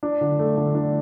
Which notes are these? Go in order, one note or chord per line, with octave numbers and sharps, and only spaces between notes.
D4
D3
A3
D3
D4